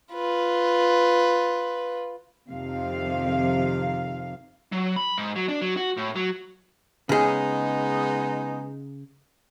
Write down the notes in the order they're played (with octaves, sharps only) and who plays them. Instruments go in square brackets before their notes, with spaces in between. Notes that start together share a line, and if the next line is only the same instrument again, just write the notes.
[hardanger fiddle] F4 B4
[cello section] F2 C3 D#3 F5
[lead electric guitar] F#3
B5
G#2
F#3
D4
F#3
F#4
A2
F#3
[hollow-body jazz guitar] C#3 G#4 [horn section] G#3 B3 D#4